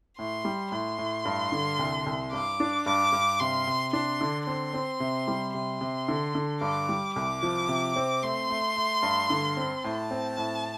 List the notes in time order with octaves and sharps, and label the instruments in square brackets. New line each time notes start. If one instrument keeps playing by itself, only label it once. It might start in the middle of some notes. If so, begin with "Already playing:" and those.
[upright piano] A2 [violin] C6
[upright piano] G3
[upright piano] A2 [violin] C6
[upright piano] A2
G2
D3
C2
C2
[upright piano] G2 [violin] D6
[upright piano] D4
[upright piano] G2 [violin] D6
[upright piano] G2
[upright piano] C3 [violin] C6
[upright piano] C3
[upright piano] D4 [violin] C6
[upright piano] D3
[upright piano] C4 [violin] C6
[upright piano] C4
C3
G3
[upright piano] C3 [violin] C6
[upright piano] C3
D3
D3
[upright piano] G2 [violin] D6
[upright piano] G3
[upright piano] C2 [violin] D6
[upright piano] F3
C3
C4
[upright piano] A3 [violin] C6
[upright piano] A3
A3
G2
D3
C4
[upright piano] A2 [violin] A5
[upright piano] C4
A2